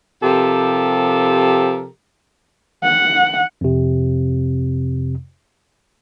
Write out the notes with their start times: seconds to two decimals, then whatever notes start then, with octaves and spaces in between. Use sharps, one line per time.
0.22 C3 F3 G4 A4 A#4
2.84 F#5
3.61 F2 C3